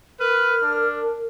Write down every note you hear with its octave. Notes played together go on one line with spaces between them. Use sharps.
A#4 B4 F6
D4